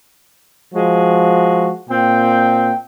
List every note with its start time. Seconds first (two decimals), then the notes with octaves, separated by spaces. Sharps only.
0.74 F3 G#3 F#4
1.90 A#2 C4 G5